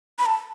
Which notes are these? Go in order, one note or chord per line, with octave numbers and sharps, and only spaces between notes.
B5
A5